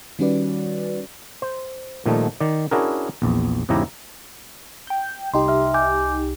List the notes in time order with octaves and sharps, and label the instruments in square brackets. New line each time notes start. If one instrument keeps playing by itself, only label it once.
[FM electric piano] D#3 G3 C#4 F#4 B4 D5
[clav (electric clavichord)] C5
A#2 D#3 F3 G3 A3 D#4
D#3 D5
C#4 D4 E4 F#4 G#4 A#4
A#1 E2
E2 G#2 C#3 E4 G4 A#5
[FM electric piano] G5 G6
[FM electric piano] C2 D#4 G4 [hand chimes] C6
[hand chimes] E5 F6
G#5 D6 G6